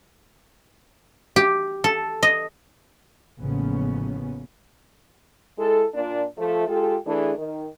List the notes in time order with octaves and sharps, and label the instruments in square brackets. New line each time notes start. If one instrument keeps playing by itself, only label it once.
[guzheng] G4
A4
D#5
[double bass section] A1 C#3 F3 A#3 B3 C#4
[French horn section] G#3 E4 A4
A#2 D4
F3 A3
G#3 F4 G4 A4
E3 A3 D4 G#4
D#3